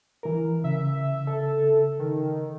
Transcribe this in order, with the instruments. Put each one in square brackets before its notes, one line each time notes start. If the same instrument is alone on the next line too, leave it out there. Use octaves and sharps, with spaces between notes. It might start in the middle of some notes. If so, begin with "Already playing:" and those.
[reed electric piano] E3 A#4
[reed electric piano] C#3 [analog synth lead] E5
[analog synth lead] A4
D#3